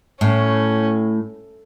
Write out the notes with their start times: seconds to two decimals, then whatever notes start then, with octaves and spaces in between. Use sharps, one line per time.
0.21 A2 C#4